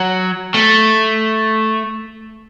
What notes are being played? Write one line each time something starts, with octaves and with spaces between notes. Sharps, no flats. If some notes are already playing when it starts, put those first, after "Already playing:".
Already playing: F#3
A3